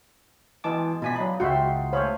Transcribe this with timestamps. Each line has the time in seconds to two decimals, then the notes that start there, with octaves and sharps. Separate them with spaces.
0.64 B2 E3 G#3 A5 D6
1.02 B2 E3 F3 D4 G#5 B6
1.16 F#3 D#4 B5
1.40 C#2 F4 F#4 E5 F#5 G5 C6
1.93 A3 G#4 C5 C#5 F5 B5